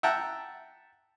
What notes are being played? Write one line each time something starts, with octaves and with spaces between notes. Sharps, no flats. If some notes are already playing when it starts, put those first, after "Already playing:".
E5 F#5 G5 A5 A#5